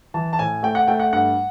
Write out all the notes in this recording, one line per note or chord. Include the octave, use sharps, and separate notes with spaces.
E3 A5
A5
A2 G#5
A3 G5
F#5
A3 G5
F#5
G2 F#5